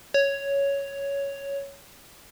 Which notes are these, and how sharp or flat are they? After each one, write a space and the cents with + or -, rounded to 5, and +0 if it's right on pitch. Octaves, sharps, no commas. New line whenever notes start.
C#5 +5